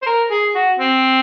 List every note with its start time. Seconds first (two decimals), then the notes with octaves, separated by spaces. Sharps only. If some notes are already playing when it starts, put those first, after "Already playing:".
0.02 C5
0.06 A#4
0.30 G#4
0.55 F#4
0.80 C4